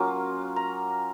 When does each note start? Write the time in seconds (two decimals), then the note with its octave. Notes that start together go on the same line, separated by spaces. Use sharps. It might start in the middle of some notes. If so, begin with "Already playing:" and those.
Already playing: F#3 A#3 C#4 F4
0.56 A#5